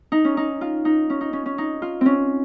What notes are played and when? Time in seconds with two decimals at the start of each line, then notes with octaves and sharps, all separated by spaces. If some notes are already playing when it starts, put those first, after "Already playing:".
0.12 D#4
0.25 C#4
0.37 D#4
0.61 F4
0.85 D#4
1.10 C#4
1.21 D#4
1.33 C#4
1.46 C#4
1.58 D#4
1.82 F4
2.01 C4 C#4